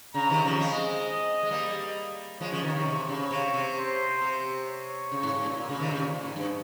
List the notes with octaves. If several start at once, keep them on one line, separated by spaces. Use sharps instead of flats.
C#3 A#5
C3 D#3
C#3 F3
G#3 C4 D#5
G#3
G3 A#3
F3 G#3 C#5
C#3 F3
C3 D#3
C3 D#3
C3
C#3
C3 C#5
C3
C5
C3
C#5
C#3
G#2
G#2
A#2
A#2
C#3
C3 D#3
C#3
A#2
A#2
G#2
G2